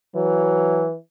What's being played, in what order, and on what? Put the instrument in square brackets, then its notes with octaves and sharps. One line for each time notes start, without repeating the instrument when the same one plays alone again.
[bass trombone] E3 [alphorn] F#3